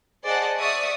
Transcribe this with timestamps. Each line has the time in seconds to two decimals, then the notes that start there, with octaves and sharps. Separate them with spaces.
0.24 G#4 C5 D5 D#5 F#5 A5
0.58 D5 E5 C#6 D#6